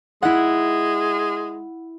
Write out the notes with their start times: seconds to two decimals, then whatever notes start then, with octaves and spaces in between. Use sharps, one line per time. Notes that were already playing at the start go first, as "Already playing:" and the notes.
0.23 G#3 E4 F#5